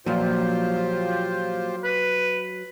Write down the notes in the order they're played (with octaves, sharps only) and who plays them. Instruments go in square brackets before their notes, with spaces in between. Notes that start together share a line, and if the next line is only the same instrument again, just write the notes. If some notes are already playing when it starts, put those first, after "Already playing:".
[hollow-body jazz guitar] A#2 F3 [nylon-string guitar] F#3 [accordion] F4 G4 C5
[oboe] B4